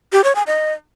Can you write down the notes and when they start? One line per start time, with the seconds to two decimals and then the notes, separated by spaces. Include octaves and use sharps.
0.13 G4
0.24 C#5
0.35 G#5
0.47 D#5